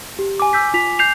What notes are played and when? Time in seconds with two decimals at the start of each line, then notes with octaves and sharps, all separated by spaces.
0.19 G4
0.40 G#5 D6
0.53 E6 G6 B6
0.74 F4 B6 F7
0.99 G6 C7 F7